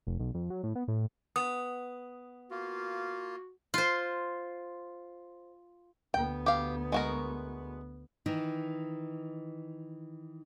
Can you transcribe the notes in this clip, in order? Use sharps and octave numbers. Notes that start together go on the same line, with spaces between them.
F1
B1
F2
F#3
A2
B3
A2
B3 D#6
A#3 F4 F#4
F4 C5
D2 B3 G5
G4 F5
G#3 F#4 A#4
D#3 E3 D#4